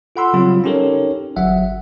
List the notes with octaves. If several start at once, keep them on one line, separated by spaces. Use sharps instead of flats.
F4 A4 F#5 B5 C6 E6
C#3 F#3 G3 C4 F4 G4
C#4 D#4 G4 A4 A#4 C#5
G1 F#3 E5 F#5